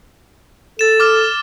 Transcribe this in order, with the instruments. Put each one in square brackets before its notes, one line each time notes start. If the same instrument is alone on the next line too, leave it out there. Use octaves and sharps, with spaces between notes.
[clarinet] A4 [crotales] A6 E7
[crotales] D6 F6 A6